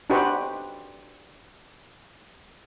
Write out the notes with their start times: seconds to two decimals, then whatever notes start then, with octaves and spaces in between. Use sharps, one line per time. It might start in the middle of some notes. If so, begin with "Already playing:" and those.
0.10 D4 D#4 F#4 G4 B4 C5